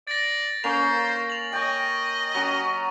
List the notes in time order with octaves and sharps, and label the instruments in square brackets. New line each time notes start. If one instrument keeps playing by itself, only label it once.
[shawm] D5 [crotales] A6 A#6
[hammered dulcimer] A#3 C#4 [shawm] C5 [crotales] F7
[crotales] F7 F#7
[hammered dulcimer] C#5 G5 [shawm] D#5
[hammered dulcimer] F#3 C#4 [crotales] C#6 D#6